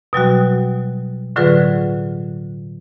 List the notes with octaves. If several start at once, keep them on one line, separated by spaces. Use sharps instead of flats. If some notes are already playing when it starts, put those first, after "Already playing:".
B2 F#3 G3 F#4
A2 D3 F#3 F4 G#4 B4